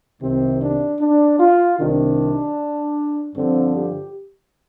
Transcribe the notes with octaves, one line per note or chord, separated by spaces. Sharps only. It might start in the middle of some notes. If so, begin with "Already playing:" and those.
C2 C3 D#3 C4
D4
D4
F4
C2 C3 D#3 D4
G2 D3 F3 C4
G4